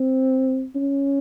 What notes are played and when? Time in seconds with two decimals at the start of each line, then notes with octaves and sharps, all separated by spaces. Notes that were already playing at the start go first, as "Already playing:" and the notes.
Already playing: C4
0.76 C#4